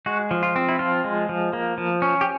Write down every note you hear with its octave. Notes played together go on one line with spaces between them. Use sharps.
G#3 F#4
F3
F4
C4
E4
F3 F4
G#3
F3
A#3
F3
C#4
G4